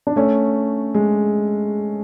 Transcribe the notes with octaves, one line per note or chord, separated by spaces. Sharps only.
D4
A3 C#4
G#3